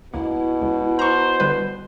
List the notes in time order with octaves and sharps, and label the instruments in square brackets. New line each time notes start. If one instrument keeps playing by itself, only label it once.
[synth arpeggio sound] C#2 A#3 [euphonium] B2 [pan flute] E4
[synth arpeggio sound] C#2
[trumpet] C5 [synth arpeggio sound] A#5 C#6
[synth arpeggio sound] D3 G3 B4